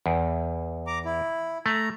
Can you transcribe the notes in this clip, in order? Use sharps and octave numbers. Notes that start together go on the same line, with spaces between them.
E2
A#5 D6
E4
A3 A#5